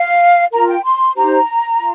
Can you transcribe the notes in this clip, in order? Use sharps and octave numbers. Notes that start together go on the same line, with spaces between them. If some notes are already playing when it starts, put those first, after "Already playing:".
Already playing: F5
F4 A#4 A#5
G5
C6
D#4 G4 C5 A#5
F4